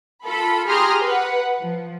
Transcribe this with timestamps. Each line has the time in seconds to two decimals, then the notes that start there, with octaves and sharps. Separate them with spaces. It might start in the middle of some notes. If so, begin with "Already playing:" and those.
0.25 F4 A4 B5
0.69 G4 G#4 A#5 C6 D#6 F6
1.03 B4 F#5
1.62 F3